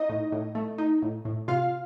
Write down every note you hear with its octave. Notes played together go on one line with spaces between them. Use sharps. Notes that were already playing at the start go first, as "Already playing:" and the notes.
Already playing: D#4 D#5
A2
A2
A3
D#4
A2
A2
C3 F4 F5